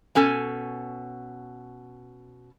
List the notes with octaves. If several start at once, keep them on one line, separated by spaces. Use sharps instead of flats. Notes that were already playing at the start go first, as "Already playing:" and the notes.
B2 C#4 A4 G#5